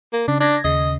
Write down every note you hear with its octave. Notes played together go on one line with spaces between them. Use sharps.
A#3
C#3 D4
D4 G#6 A#6
D#2 C#3 D#5